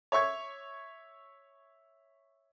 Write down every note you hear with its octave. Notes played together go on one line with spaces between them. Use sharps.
C#5 E5 C#6 G#6